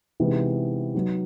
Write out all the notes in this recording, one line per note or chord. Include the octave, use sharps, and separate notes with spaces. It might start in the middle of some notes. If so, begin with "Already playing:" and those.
C3 E3 G#3 B3 D#4
F#3 B3 D#4